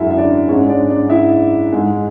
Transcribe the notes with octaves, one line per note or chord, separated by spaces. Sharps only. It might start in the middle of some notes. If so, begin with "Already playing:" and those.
Already playing: F#2 D3 G#3 E4 F#4 A4 E5
E5
D4 D5
G#2 G#3 C#4 C#5
D4 D5
D4 D5
E4 E5
G#2 G#3